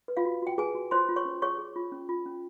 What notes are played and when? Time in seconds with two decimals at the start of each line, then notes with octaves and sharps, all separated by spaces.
0.08 B4
0.17 F4 F5
0.25 F#4
0.42 F#4 G5
0.58 G#4 B4 G#5
0.75 F#4
0.91 F4 C5 C6
1.09 F4
1.16 C#5 C#6
1.25 C#4
1.42 G#4 C#5 C#6
1.58 G#4
1.76 F4
1.92 C#4
2.09 F4
2.26 C#4